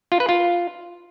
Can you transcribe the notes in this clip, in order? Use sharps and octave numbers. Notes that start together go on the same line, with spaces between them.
F4
B4
F4